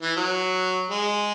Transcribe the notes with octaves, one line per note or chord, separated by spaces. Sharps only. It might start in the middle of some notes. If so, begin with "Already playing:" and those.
E3
F#3
G#3